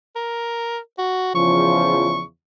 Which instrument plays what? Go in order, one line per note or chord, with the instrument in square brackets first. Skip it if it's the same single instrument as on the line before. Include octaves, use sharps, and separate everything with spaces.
[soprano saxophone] A#4
F#4
[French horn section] E2 C#3 F3 [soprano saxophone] C#6